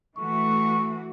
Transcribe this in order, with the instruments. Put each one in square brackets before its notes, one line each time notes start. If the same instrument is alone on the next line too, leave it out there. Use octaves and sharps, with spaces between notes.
[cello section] E3 A3 F#4 [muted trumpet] C#6